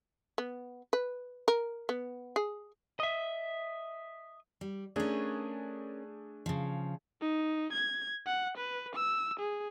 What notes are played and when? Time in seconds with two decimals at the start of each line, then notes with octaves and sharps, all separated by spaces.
0.38 B3
0.93 B4
1.48 A#4
1.89 B3
2.36 G#4
3.00 D#5 E5
4.61 G3
4.96 A3 C#4 D4 G#4 A#4
6.46 C#3 F3
7.21 D#4
7.72 G#6
8.26 F#5
8.57 B4
8.95 E6
9.39 G#4